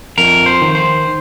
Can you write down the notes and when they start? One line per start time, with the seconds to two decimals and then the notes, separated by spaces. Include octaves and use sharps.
0.18 F2 A#4
0.46 C5
0.61 D#3
0.75 C5